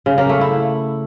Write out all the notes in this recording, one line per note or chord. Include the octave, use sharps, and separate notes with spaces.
C#3
A#3
A3
E4